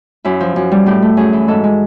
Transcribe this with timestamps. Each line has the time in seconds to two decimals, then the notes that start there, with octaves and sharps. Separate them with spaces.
0.25 F#2 E4
0.40 F3
0.56 F#2
0.72 G3
0.86 A2 G4
1.02 A3
1.17 F#2 G#4
1.33 E3
1.48 G#2 A4
1.64 G#3